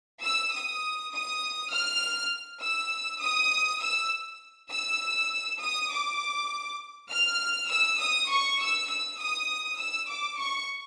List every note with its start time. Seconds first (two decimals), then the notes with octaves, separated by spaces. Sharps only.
0.22 E6
0.52 D#6
1.11 D#6
1.72 F6
2.61 E6
3.20 D#6
3.81 E6
4.71 E6
5.61 D#6
5.90 D6
7.10 F6
7.69 E6
7.99 D#6
8.30 C#6
8.59 E6
8.89 E6
9.19 D#6
9.78 E6
10.09 D6
10.38 C#6